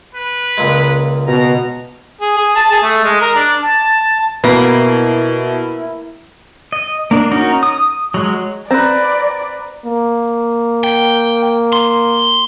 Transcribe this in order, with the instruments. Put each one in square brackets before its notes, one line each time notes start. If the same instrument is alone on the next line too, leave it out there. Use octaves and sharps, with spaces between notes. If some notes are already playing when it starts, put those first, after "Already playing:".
[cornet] B4
[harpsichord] C#2 A#2 G#3
[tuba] B2 [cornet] A#5
[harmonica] G#4
G#4
A5
G#4
A3
G#3
A#4
D4
[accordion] A5
[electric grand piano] B2 [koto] A#3 [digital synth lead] E4 [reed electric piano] B4
[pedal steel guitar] D#5
A#3 D4
C#4 D#4 F#4 A#4
D#6
F#3 G#3
[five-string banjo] C4 [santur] B4 A#5 [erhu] D5
[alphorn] A#3
[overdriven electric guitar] G5
C6